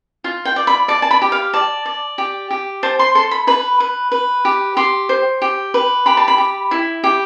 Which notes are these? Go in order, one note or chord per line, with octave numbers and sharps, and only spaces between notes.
F4
G5
D5
B5
D5 A5
A5
B5
G4
F5
D5 A5
D5
G4
G4
C5 A5
C6
A4 C6
B5
B4 B5
B4
B4
G4
G4 C6
C5
G4
B4
G4 B5
A5
B5
G4
E4
G4